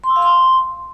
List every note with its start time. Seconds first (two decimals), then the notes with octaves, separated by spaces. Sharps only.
0.04 C6
0.10 E6
0.16 F5
0.22 C6